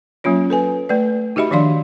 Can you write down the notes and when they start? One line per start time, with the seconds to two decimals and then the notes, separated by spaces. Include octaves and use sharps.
0.24 F#3 A#3 C#4 F4 C#5
0.50 A4 B4 G#5
0.89 A3 B4 D5
1.36 D#4 F#4 G4 D#5 E5 B5
1.51 D#3 F3 D4 D5 F5 C6